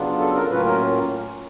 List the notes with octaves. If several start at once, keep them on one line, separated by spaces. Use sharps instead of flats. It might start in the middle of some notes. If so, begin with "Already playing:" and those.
Already playing: C#3 F#3 B3 D4 F4
A4
A#4
A2 F#3 A#3 C#4 F4 B4
A#4